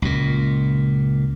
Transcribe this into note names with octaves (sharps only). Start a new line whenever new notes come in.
C#2 A#2